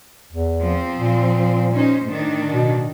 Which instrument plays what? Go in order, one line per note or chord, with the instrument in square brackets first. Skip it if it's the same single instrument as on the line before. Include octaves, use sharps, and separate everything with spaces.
[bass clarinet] E2
[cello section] F3 C4
[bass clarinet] A#2
[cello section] C#4 D#4 C5
A2 D#3 D4
[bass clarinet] B2